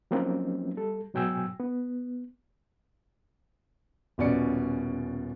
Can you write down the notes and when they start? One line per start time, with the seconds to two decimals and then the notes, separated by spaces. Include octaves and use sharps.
0.11 F3 F#3 A#3 C4 C#4 D#4
0.77 G3 A4
1.14 G#2 B2 F#3 G5 G#5 E6
1.60 B3
4.18 D#1 B2 C#4 D5 C#7